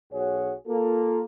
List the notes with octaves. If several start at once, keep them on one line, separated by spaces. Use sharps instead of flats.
B1 F#4 G#4 C#5
A#3 F4 A4